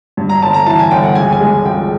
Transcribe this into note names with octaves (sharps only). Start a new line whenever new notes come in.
G2
A#5
G1 A5
A#5
E3 A5
G#5
G1 G5
F#5
C#2 G#5
G#5
G#3
C#2 G5